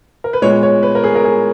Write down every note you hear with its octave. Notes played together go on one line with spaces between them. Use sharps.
A#4
B4
A#2 G#3 B3 C#5
C#5
B4
A#4
G#4
A#4
G#4